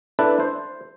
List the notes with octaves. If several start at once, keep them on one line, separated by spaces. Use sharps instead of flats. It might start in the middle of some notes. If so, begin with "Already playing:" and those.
D4 E4 A4 B4 D5 E5
C5